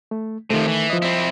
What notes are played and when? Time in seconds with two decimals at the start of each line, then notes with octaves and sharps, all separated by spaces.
0.11 A3
0.50 C3 D#3 F3 A3
0.68 E3
0.90 F3 D#5
1.02 C4 E4